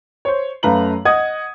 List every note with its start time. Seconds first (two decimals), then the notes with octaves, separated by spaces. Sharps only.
0.25 C5 C#5
0.63 F#2 A3 B4 F5 A#5 F#7
1.05 D#5 F#5 D#6 G#6